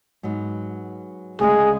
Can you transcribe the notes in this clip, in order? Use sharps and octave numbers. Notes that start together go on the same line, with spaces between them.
G#2 F#3 B3
D2 C#3 G#3 G#4